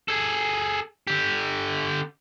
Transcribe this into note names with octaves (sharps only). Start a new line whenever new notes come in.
G#4 A4
D3 G4